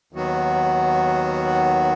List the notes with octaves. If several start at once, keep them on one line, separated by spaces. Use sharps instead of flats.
D#2 D#3 F#3 B3 F#4